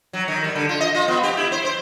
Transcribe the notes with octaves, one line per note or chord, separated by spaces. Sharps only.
F#3
D#3
G3
D3
F4
D#5
F4
B3
G4
E4
C5
C5